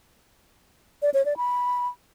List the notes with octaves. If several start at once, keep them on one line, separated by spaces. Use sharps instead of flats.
D5
C#5
D5
B5